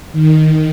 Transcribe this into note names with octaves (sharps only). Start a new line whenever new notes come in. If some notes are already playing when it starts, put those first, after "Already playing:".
D#3